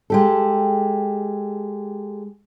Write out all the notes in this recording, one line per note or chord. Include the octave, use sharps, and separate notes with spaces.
G#3 G4 A4